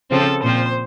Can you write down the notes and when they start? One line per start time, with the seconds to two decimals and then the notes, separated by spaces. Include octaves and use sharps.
0.10 C#3 F3 C4 A4
0.43 A#2 F3 C4 C5